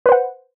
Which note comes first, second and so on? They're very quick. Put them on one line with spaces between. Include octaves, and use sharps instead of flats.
B4 C5 F#5